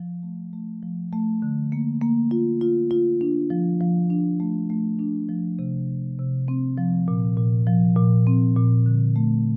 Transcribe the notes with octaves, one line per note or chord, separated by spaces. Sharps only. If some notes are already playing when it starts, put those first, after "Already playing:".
Already playing: F3
A3
A3
F3
A3
D3
A#3
A#3
F4
F4
F4
D4
F3
F3
D4
A3
A3
D4
F3
C3
F3
C3
C4
F3
A#2
A#2
F3
A#2
C4
A#2
D3
A3